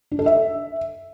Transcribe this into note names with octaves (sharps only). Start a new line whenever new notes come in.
D4
A4
E5